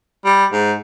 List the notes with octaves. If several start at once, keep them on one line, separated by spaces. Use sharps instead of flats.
G3
G#2